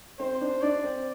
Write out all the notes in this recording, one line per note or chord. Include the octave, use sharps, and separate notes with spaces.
C4 C5
D4
D4 D5
C4